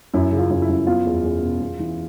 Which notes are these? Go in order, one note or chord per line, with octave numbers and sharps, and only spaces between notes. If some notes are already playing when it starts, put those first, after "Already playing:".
F#2 E4
C#3
F4
F#2
E4
F#2
B3 F4
E2
E2
B2
E2
E3